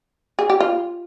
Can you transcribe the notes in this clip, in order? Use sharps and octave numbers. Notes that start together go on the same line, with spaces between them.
G#4
G4
F4